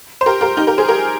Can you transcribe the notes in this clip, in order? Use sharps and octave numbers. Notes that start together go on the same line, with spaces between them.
C5
G4 A#4
G4 A#4
D#4 G4
G4 A#4
G#4 C5
G4 A#4